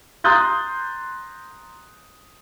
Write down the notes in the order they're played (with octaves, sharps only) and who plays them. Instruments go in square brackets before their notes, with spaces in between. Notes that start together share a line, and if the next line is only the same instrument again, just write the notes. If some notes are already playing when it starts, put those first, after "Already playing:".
[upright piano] A#5 C6 D#6 F#6 G6 A6